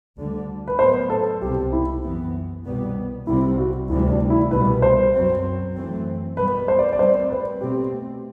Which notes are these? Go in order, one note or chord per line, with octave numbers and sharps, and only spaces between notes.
D2 D3 G3
B4
A2 F#3 B3 C5
A4
C2 B2 G3 C4 G4
E4
F#2 E3 B3
C2 B2 G3 B3
C2 C3 G3 C4 E4
F#4
D2 C3 E3 G3 E4
D4
E4
C2 B2 G3 B4
C5
F#2 F#3 C4
F#2 E3 A3 C4
B2 G3 B3 B4
C5
D5
D5
A2 G3 C4 C5
B4
B2 A3 C4 G4